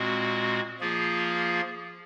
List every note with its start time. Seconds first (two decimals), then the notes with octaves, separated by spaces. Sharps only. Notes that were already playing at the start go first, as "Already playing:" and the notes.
Already playing: A#2 G#3 C4 F#4
0.80 F3 A#3 F4 G#4